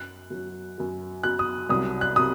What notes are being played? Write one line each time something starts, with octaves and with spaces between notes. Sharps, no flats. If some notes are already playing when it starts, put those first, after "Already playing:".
Already playing: F#2 F#3 F#6
F#2 F#3
F#2 F#3
F#2 F#3 F#6
D#6
C2 C3 F#3 D#6
F#6
C3 F#3 D#6